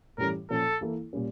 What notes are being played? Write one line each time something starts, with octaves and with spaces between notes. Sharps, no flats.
A2 E3 G3 C#4 A#4
A#2 F3 C#4 F4 A4
E3 A#3 E4 A4
A#2 G3 C#4